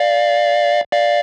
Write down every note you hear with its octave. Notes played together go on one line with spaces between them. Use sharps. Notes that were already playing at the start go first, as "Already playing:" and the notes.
Already playing: D5 F5
D5 F5